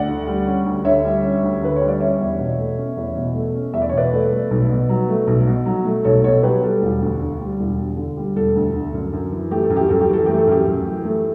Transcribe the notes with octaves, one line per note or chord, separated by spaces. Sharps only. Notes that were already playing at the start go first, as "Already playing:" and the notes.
Already playing: D2 D5 F#5
D3
G3
C#4
D2
D3 C#5 E5
G3
C#4
D2
D3 B4
G3 C#5
D5
C#4 C#5 E5
E2
B2
A3
C#4
E2
B2
A3
C#4
E2 E5
D5
C#5
B2 B4 D5
A3
A3
B1
B2
F#3
A3
B1
B2
F#3
A3
B1 A4 C#5
B2 A4 C#5
F#3 G4 B4
G3 A4
E1
D2
D3
G3
E1
D2
D3
G3
E1 A4
D2
D3
F#2
F#2
E3
A3 G4
A4
F#2
G4
F#2 A4
G4
E3 A4
A3 G4
A4
F#2 G4
F#2
E3
A3